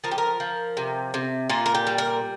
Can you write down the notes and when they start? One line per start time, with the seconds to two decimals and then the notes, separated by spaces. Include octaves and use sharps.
0.04 F3 A#4
0.11 G4
0.18 A#4
0.40 F3
0.77 C3
1.14 C3
1.49 A#2 F4
1.66 A#4
1.75 G4
1.87 G3
1.98 A#4